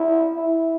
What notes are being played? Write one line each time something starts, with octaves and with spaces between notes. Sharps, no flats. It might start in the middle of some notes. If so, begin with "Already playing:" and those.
Already playing: E4
E4